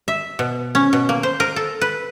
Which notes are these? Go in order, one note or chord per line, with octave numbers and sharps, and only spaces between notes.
E5
B2
C#4
B2
A#3
C5
A#4
A4
B4